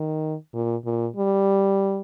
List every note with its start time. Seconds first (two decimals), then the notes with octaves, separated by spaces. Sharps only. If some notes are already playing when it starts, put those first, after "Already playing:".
Already playing: D#3
0.54 A#2
0.85 A#2
1.16 G3